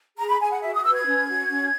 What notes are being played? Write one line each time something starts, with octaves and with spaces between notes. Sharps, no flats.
G#4 A#5
B5
G#4 G#5
F#5
F#4 E5
D#6
B4 E6
G#6
C#4
F#4
C#4